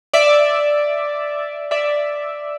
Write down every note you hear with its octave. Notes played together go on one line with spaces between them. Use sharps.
D5 E5
D5 E5